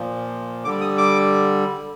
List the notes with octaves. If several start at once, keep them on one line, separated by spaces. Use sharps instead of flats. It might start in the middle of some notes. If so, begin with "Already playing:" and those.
Already playing: A#2 F3
D3 G3 D6
D#6
D6